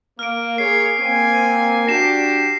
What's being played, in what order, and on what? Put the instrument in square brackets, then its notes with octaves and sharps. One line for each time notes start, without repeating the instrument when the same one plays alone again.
[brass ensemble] A#3 [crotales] F6 D7
[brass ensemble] A#3 G#4 C#5 [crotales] C7
[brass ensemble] A#3 C4 G#5
[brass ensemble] D4 F#4 G4 [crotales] A#6 C7 E7